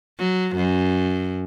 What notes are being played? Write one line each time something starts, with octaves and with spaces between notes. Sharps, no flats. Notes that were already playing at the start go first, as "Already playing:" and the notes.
F#3
F#2